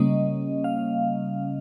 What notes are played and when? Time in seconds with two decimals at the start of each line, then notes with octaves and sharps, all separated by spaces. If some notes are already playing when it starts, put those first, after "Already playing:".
Already playing: C#3 G3 A#3 C#4 D#5
0.64 F5